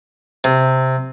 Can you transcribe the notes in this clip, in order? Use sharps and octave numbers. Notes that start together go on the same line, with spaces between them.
C3